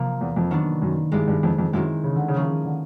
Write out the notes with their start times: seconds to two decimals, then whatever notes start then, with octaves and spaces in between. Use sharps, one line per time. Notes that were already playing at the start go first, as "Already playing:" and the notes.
Already playing: C3 F3 A#3 C4
0.21 E2
0.36 F2
0.51 D#3 F#3 B3 D4
0.82 F#2
1.12 G2 G#3 B3 E4 G4
1.28 G2
1.43 F2
1.58 F2
1.73 F#2 D#3 G#3 C4 E4 G4
2.04 C#3
2.16 D3
2.28 C#3
2.34 F3 A#3 C#4 E4 G#4
2.64 D3